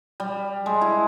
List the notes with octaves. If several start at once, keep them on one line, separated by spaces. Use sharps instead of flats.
G3
G#3
E4